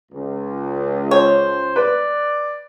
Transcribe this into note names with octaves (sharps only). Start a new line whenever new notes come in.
C#2
C5 C#5
B4 D5